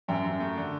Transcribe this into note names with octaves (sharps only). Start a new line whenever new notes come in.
F#2 E5 G5
F#2
A3
D3